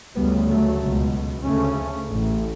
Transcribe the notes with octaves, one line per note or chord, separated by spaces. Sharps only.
D2 C#3 G3 B3
F#3 A3
C#2 B2
D2 C#3 A3 C#4
A1 A2